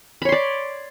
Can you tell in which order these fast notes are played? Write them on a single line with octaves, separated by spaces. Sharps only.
B5 C#5 C6 D5